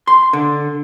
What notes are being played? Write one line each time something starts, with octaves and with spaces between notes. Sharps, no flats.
C6
D3